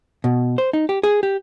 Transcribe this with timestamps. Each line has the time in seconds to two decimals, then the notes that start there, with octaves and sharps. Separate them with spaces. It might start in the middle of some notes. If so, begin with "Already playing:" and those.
0.24 B2
0.58 C5
0.73 D#4
0.89 G4
1.03 G#4
1.23 G4